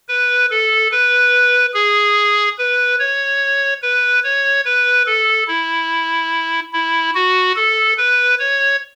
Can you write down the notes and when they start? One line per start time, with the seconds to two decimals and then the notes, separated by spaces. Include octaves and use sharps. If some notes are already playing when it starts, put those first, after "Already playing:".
0.08 B4
0.51 A4
0.91 B4
1.74 G#4
2.58 B4
2.99 C#5
3.82 B4
4.24 C#5
4.65 B4
5.06 A4
5.48 E4
6.73 E4
7.15 F#4
7.56 A4
7.98 B4
8.39 C#5